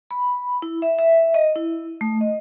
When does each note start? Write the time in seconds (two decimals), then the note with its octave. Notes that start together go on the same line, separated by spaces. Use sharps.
0.11 B5
0.62 E4
0.82 E5
0.99 E5
1.34 D#5
1.56 E4
2.01 A3
2.21 D#5